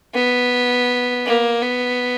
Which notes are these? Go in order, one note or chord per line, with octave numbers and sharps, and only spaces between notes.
B3
A#3
B3